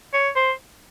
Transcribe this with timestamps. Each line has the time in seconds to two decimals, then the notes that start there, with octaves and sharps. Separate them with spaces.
0.13 C#5
0.36 C5